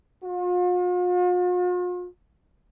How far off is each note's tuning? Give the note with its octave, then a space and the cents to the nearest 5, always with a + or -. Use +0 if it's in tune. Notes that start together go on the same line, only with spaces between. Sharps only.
F4 +45